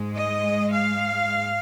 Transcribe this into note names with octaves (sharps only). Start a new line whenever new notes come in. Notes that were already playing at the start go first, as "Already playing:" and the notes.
Already playing: G#2 G#3
D#5
F5